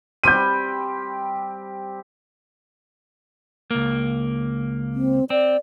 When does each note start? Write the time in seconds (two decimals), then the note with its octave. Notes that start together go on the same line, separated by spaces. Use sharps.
0.24 G3 C4 G4 G6 D#7
3.71 C#2 A#3
4.94 C4
5.30 C4 D5